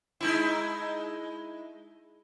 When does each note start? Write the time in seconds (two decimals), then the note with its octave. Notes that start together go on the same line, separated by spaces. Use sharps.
0.21 G#3 D#4 E4